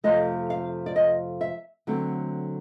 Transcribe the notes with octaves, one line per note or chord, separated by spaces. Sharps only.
F2 C3 F3 A3 D#5
F5
D5
D#5
E5
D3 F#3 A3 C4